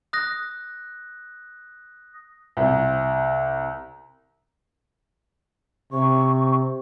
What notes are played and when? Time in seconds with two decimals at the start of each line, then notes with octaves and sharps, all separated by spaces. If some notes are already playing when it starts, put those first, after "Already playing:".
0.13 D#6 F#6 A#6
2.57 C2
5.92 C3 C#6